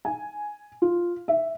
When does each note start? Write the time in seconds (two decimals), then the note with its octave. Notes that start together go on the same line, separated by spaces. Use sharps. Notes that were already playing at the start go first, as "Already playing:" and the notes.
0.05 G#5
0.82 F4
1.28 E5